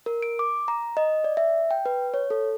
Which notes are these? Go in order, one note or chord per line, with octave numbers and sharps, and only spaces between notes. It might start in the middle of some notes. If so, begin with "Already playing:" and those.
A#4
D7
D6
A#5
D#5
D5
E5
G5
B4
C#5
A4